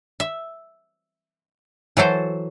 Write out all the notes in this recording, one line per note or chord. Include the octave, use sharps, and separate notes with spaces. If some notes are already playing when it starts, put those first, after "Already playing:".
E5
E3 F#3 A4 C5